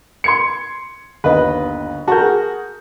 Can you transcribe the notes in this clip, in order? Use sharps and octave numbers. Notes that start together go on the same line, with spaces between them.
C6 G#6 C#7
G1 D#2 B4 D#5
F#4 A#4 A5 G6
G#4